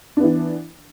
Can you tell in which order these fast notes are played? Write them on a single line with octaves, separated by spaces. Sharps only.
D4 B3 E3